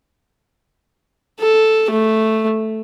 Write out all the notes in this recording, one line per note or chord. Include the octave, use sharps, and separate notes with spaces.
A4
A3